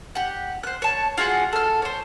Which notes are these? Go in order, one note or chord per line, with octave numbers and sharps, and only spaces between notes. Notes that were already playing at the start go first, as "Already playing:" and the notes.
G4 F#5
C5 F#6
C#5 A5
F4 F#4 G#4 F#5
A4 F6
C5 C#5